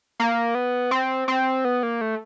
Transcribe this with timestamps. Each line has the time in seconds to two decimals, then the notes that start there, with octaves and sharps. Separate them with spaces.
0.20 A#3
0.55 B3
0.91 C4
1.28 C4
1.65 B3
1.83 A#3
2.01 A3